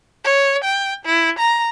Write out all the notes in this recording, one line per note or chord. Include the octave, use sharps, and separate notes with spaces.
C#5
G5
E4
A#5